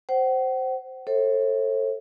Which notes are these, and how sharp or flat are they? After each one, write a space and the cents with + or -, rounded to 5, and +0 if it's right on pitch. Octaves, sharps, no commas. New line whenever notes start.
C5 +0 F#5 +40
A4 +15 C5 +45 E5 -20